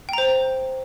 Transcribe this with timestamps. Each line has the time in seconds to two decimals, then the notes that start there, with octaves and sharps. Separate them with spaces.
0.09 G5
0.13 A#5
0.18 C5